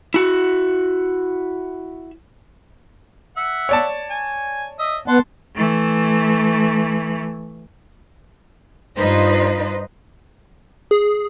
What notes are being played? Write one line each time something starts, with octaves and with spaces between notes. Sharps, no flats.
E4 F#4
E5 F#5
C#5 D5 A5
G#5
D#5 E5
B3 F#5 A5 C6
E3 A3
G2 D#4 F4 B4 C5 D#5
G#4